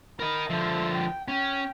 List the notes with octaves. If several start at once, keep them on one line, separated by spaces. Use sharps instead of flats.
A#4 D#5 B5
D3 F3 A4 E5
G5
C#4 G5